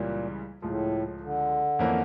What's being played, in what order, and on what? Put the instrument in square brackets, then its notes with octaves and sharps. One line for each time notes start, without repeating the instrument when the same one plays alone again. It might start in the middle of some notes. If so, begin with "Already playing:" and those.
Already playing: [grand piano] C#2 C#3 E3 G3 C#4 [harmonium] A#2
[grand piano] C#2 C#3 F3 [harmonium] A2
[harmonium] D3
[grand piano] F2 E3 A#3 C#4 E4